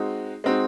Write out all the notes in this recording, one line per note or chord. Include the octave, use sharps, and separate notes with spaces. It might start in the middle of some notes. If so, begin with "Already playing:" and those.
Already playing: G#3 C4 D#4 F#4
G#3 C4 D#4 F#4